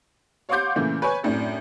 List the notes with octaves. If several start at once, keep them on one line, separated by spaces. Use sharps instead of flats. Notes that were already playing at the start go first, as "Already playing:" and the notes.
C#5 F5 F#5 C6 D6 G6
A#2 C#3 E3 A3
B4 C#5 G#5
F#2 A2 C4 D4